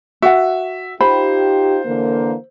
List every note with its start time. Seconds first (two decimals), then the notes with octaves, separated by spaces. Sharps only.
0.22 F#4 E5 F#5
1.01 D#4 F4 G4 C5 B5
1.85 D3 E3 A#3